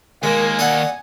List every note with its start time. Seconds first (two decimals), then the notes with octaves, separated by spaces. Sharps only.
0.23 D#2 G#3 A#3 A#4 G#5
0.59 A4 D5 D#5 F#5